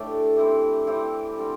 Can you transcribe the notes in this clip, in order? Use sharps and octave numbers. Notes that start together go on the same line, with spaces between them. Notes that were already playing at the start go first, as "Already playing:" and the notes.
Already playing: A2 A3 D4 G4
E3 C4 E4 G4
E3 C4 E4 G4
D3 G3 C4